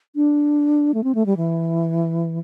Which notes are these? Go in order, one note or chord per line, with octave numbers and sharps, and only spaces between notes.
D4
A3
C4
A3
G3
E3